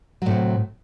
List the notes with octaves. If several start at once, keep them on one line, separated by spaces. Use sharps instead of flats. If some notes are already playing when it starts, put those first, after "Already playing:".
A2 C3 F#3